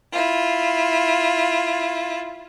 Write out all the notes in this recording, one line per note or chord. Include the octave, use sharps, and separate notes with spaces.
E4 F4